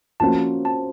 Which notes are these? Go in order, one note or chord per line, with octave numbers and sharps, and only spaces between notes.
F3 A#3 C#4 F#4 C5 A5
A5